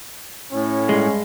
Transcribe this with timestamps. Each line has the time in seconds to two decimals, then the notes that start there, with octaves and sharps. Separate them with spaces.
0.52 A2 C#4
0.89 G2 G#3